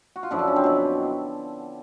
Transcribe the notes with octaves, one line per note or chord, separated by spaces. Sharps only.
F#4
F4
F#2 D3 F3 E4
D4
C#4
C4
B2 F#3